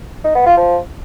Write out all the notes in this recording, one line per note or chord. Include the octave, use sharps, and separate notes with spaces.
D#4
B3
F4
F3